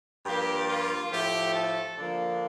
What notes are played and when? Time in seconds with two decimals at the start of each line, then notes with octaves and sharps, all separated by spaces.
0.24 G2 F3 A#3 G4
0.68 F4
1.10 A2 F3 A3 G4
1.54 A4
1.96 D3 F3 A#3 D4